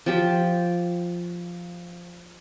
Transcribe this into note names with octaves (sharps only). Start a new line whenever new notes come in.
F3 G4